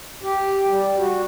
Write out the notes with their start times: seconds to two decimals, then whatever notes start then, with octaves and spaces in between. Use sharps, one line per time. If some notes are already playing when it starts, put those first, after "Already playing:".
0.23 G4
0.68 G3
0.98 F#4